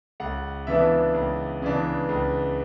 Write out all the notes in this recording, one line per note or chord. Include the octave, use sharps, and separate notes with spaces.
C#2 F#5
C#3 E3 B3 D4 E5
C#2
C#3 E3 B3 D4
C#2